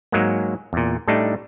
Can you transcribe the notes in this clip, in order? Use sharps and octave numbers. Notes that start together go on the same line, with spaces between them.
G#2 F#3 G#3 A#3
E2 A#2
A2 G3 A3 D4 D#4